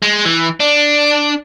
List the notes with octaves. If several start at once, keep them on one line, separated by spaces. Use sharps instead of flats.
G#3
E3
D4